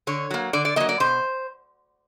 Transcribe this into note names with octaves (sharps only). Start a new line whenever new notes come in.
D3 C#5
F#3 A#3
D3 D5
D5
F#3 A#3 D#5
D5
B2 C5